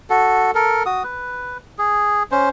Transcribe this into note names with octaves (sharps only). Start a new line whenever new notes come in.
F#4 A4
A4 A#4
F#4 D#6
B4
G#4
C#4 C5